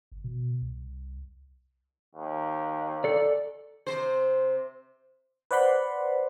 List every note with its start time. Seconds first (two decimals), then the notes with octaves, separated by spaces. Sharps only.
0.12 G1
0.24 B2
0.62 C2
2.15 D#2
3.04 A4 D5
3.87 C3 C5
5.51 B4 C5 D5 F#5 B5 C6